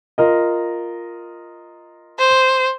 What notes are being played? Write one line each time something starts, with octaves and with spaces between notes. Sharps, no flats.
F4 A#4 D#5
C5